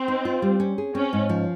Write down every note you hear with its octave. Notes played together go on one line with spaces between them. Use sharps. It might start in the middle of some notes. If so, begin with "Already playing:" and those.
Already playing: C4
D#4
F4
G3
C#4
G#4
C4 C#4
G#2
F3